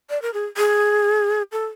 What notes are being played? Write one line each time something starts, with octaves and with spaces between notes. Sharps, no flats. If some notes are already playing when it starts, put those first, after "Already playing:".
D5
A#4
G#4
G#4
A4